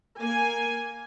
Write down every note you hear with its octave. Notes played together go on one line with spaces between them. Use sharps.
A#3 G#5